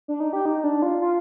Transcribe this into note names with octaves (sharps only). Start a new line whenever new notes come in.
D4
D#4
G4
D#4
D4
F4
F4